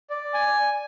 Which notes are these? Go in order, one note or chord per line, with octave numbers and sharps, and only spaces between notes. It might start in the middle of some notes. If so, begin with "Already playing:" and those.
D5
G#5